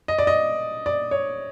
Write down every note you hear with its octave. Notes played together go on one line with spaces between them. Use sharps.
D#5
D5
D#5
D5
C#5